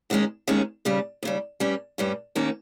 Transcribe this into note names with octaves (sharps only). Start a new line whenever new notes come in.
D#2 D#3 G#3 C#4
D#2 D#3 G#3 C#4
D#2 C#3 G3
D#2 C#3 G3
G2 G3 C#4
G2 G3 C#4
D#2 D#3 A#3 C#4